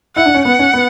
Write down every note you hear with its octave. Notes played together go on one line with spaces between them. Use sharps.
E4 F#5
D4
C#4
B3 F#5
C#4
B3